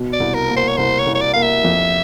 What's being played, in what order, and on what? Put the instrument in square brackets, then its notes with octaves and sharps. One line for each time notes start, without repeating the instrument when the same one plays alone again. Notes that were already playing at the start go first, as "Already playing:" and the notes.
Already playing: [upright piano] B2
[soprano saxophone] D5
[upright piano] C2
[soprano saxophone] A#4
[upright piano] A#3
[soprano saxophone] C5
C#5
[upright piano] C2 [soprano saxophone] C5
[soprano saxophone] C#5
[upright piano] C2
[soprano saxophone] C#5
D5
[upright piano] A#3 [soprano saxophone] F5
[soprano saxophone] E5
[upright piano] F2